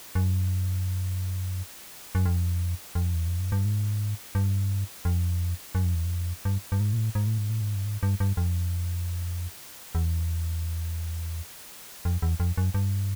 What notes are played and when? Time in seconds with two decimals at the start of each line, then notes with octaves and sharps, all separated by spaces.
0.15 F#2
2.15 F#2
2.26 F2
2.95 F2
3.14 E2
3.27 F2
3.39 F#2
3.52 G2
3.65 G#2
4.35 G2
5.05 F2
5.75 F#2
5.85 F2
5.95 E2
6.05 F2
6.45 G2
6.72 G2
6.80 G#2
6.93 A#2
6.97 A2
7.15 G#2
7.27 A2
7.38 G#2
7.50 A2
7.61 G#2
7.75 G2
7.85 G#2
8.03 G2
8.20 G2
8.37 F2
9.95 E2
12.05 F2
12.22 E2
12.40 F2
12.57 F#2
12.74 G2